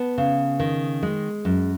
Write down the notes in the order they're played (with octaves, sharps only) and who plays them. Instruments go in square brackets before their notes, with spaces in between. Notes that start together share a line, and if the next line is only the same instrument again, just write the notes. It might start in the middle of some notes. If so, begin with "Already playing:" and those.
Already playing: [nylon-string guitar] B3 A5
C#3
D#3
G#3
F#2